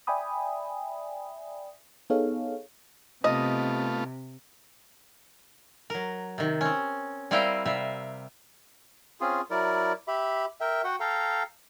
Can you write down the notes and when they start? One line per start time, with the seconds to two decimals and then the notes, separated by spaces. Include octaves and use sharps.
0.07 D5 E5 G5 G#5 B5 D#6
2.10 B3 D#4 G#4 A4 C#5 F5
3.24 C3 A3 B3 F4 D#5
5.90 F#3 A#4
6.38 C3 D#3
6.61 C4 C#4
7.31 G3 C4 E4 A#4 F5 G5
7.66 C3 G3 E5 F5
9.21 C4 C#4 F4 G#4
9.50 F#3 E4 A#4 D5
10.08 G4 E5 B5
10.61 A#4 E5 G5
10.84 F#4 F#5 G5
11.00 A4 F5 G5 A#5